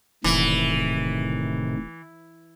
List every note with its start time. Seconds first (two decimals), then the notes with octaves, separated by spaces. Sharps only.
0.24 E1 A2 C3 D#3 E3